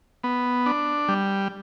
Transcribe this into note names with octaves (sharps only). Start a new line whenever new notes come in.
B3
D4
G3